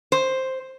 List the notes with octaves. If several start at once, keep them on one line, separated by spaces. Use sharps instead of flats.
C5